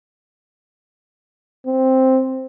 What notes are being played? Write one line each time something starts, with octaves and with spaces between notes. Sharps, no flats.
C4